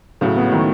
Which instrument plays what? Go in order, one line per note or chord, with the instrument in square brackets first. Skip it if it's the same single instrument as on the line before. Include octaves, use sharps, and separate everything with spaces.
[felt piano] A2 C#3 [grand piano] F#3
[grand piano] B3
[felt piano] A2 [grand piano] D#3